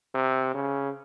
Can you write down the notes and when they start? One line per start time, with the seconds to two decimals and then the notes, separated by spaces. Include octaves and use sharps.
0.15 C3
0.54 C#3